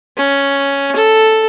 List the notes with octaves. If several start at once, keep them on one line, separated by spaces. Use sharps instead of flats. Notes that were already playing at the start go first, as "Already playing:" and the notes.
C#4
A4